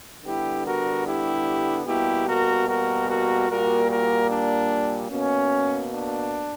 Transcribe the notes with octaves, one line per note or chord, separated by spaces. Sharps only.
D3 G3 B3 E4 G4
F#4 A#4
E4 G4
B2 G3 A#3 E4 G4
F#4 A#4
F#4 A#4
F#4 A#4
A#2 G3 A#3 F#4 A#4
F#4 A#4
D4
B2 A#3 C#4
D4